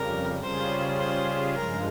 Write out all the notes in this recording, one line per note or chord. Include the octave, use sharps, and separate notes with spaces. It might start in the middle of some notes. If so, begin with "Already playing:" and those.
Already playing: F2 C#3 G3 A#4
C#3 G3 C#4 F4 G#4 C5
C5
G2 F3 G#3 A#4